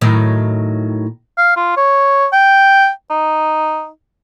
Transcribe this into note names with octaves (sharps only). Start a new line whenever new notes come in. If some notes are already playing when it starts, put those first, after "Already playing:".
A2 D#3 F#3
F5
F4
C#5
G5
D#4